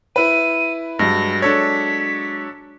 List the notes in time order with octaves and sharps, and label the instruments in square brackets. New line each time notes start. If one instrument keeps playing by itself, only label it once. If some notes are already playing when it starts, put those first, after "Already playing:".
[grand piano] E4 B4 [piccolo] D#7
[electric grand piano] G2 [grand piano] F#3 G#3 [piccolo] A#6
[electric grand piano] D4 A4 C#5 [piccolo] B6